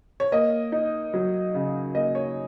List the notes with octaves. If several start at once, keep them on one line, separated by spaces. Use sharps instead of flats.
C#5
A#3 D#5
D#4
F#3
C#3
A#3 D#5
C#5